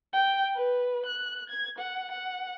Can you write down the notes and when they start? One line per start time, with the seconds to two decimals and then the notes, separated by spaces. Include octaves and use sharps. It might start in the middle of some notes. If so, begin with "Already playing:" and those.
0.13 G5
0.54 B4
1.06 F#6
1.50 G#6
1.78 F#5
2.11 F#5